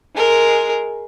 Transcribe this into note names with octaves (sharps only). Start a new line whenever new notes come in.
G#3 A#4